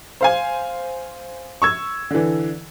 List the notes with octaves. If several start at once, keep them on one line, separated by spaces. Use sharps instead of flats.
C5 F5 G#5
C#6 E6 G#6
D3 E3